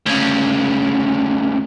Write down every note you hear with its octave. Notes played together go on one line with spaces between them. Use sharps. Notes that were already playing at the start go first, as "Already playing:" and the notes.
D2 C#3